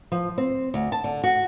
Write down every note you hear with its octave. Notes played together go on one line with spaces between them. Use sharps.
F3
C4
D2
A5
D3
F#4